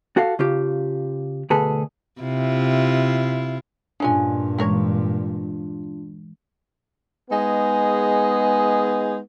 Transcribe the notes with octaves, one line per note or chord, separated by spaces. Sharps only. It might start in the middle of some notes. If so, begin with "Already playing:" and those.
F#4 A4 F5
C#3 F4 G4
D2 B2 G#4 A4 B4
C3 E4 F4
G2 A#2 G#3 C#4 D4 F4 G#5
E3 G#3 C#4 A#4 C#5
G#3 B3 D#4 G#4